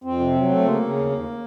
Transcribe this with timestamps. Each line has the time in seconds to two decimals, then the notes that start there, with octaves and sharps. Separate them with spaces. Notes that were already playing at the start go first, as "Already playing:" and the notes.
0.04 F2 C4
0.20 C3
0.35 F#3
0.49 A3
0.64 C#3 A#3
0.80 C#3
0.96 D#2
1.10 D#2